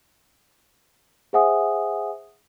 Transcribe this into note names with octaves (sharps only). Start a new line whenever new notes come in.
G#4 C5 E5 F#5 G#5 D#6